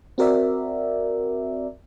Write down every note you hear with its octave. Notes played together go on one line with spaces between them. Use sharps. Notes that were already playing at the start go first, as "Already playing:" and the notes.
C4 F#4 A#4 D5 E5